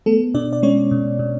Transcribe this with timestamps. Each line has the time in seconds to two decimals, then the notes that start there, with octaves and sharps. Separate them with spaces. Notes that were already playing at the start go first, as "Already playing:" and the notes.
0.06 A3 B3 A4
0.34 B2 D4 D5
0.53 D5
0.63 G#3 C#4 C#5
0.91 B2
1.19 B2